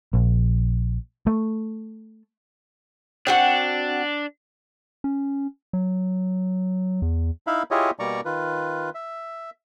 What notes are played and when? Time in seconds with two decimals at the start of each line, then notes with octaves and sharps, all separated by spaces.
0.14 A#1
1.27 A3
3.27 C4 D4 F#4 F#5
5.04 C#4
5.73 F#3
7.02 E2
7.47 D#4 E4 E5 F5 B5
7.71 E4 F4 G4 G#4 C#5 D#5
7.99 B2 G3 A#3 D5 A#5 C#6
8.25 D#3 F4 B4
8.95 E5